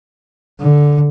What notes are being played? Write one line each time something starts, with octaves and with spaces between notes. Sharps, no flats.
D3